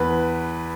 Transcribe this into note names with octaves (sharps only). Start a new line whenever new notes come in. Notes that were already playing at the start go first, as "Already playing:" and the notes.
Already playing: E2 B4